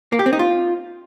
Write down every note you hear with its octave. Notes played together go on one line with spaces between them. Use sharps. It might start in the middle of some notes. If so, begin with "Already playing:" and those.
A#3
G4
C4
D#4
F4